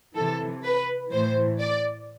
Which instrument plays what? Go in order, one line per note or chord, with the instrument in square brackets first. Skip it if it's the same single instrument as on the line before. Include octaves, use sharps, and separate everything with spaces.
[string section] C3 E3 A4
B4
A2 E3 C5
D5